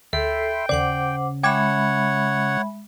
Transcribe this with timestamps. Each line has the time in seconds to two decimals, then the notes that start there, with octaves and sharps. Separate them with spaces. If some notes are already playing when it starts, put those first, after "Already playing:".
0.13 D2 A4 E5 G5 B5 C6
0.69 D#2 C#3 C5 D5 F#5 D6
1.43 G#3 C#5 E5 F#5 G5 B5 D6 G#6